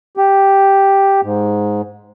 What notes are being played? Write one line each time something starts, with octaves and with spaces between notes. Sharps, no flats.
G4
G#2